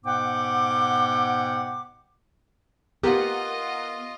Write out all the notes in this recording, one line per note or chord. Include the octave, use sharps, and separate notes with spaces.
G#2 B2 B3 F#5 G5 D6
B3 F4 G4 A#4 D#5 F#5